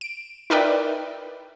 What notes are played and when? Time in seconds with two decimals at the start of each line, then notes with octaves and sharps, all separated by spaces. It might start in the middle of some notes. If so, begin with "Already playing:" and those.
0.01 D7
0.50 D#4 A#4 B4 D5 E5 G5